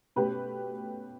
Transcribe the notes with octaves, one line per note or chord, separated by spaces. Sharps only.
B2 A3 C#4 G4 B4